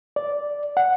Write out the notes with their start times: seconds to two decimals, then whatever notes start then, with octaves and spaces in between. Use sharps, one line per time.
0.16 D5
0.77 F#5